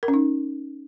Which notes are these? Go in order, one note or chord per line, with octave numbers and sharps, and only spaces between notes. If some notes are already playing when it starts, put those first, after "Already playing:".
A#4
C#4
D#4